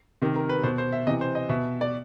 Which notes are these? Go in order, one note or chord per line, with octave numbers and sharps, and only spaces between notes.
C3 D#3
A#4
B4
B2 C5
C5
E5
C3 E3 D#5
C5
D#5
B2 E5
D5